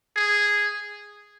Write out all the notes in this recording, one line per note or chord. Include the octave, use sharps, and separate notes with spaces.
G#4